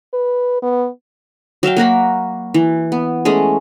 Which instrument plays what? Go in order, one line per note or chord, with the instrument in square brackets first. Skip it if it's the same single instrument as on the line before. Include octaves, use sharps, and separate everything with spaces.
[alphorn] B4
B3
[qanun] F#3 E5 F5 G5
A#3 F#4 A#4 B5
E3
B3
G#3 A3 C#4 G#4